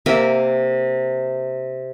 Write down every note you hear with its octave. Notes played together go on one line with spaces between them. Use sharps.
C3 A#3 A#4 E5